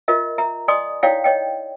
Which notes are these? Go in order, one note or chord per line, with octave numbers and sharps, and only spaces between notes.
F4 A#4 D#5 E5
E5 A#5
D5 D#5 G#5 C6 D#6
D#4 E4 C#5 D5 F5 G5
C#5 D#5 G5